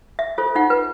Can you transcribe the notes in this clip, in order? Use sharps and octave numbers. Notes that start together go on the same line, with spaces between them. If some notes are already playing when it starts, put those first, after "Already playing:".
E5
F4 A4 C5
D#4 F4 F#5
B4